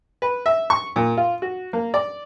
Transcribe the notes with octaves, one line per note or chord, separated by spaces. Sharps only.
B4
E5
C#6
A#2
F4
F#4
A#3
D5